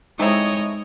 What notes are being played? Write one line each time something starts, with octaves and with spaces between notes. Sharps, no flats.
G#3 A3 C4 D#4 E4 C#5 D#5